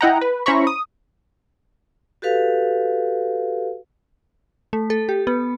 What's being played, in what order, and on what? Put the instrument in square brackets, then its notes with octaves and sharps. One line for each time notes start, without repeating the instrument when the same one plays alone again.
[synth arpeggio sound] E4 D#5 F#5 G5 A#5
B4
C#4 E4 C5 A#5 B5 C#6
D#6
[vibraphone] F#4 G4 A4 B4 F5
[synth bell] A3
A4
G4
B3